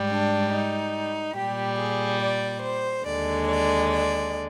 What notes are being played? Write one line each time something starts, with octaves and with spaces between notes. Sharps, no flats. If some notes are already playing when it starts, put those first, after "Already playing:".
Already playing: G#2 G3
D4
D#4
A#2 G3 G4
G#4
D5
C5
D#2 D3 G#3 D5
D5
D5